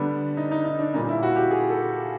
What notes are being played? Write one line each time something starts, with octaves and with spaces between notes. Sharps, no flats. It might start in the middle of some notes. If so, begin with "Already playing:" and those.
Already playing: D3 G3 B3 D4
D#4
D#4
D#4
D4
A#2 G3 A#3 C#4 D#4
E4
F#4
G4
G#4
A4